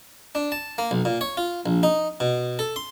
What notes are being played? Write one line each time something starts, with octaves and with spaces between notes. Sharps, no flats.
D4
A5
A#3
B1
A#2
C#5
F4
A#1
D#4
B2
A4
C6